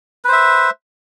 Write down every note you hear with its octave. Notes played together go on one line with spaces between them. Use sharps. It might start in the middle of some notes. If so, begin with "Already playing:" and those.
B4 C5 E5